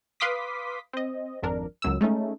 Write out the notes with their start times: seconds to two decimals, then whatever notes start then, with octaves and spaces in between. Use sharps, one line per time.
0.20 B4 F5 C6 D6 D#6 B6
0.93 C4 D#5
1.43 G#1 F2 D4 A#4
1.82 C#2 F#2 E6
2.01 G#3 A3 C#4 D#4